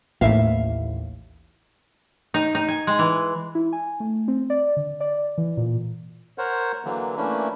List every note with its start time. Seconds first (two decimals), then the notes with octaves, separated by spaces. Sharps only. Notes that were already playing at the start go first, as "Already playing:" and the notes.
0.21 A1 D#2 A2 E5 F5
2.34 D#4
2.55 D#4
2.68 G#5
2.87 G#3
2.99 E3
3.55 E4
3.73 G#5
4.00 A3
4.28 C4
4.50 D5
4.77 D3
5.00 D5
5.38 E3
5.57 A#2
6.38 A#4 C5 C#5 F#5
6.85 D3 E3 F#3 A#3
7.17 E3 A3 A#3 C#4 D4 E4